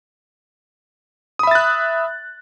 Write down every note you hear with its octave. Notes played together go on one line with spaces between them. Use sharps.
E5 B5 D#6 F#6 A6